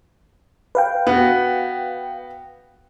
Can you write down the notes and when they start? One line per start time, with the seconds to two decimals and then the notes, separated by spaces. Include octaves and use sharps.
0.75 B4 F5 G5
1.07 B3 F#4